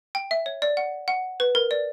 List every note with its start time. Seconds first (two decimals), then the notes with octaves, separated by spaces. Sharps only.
0.15 G5
0.31 E5
0.46 C#5
0.62 D5
0.77 F#5
1.08 F#5
1.40 B4
1.55 A#4
1.71 D5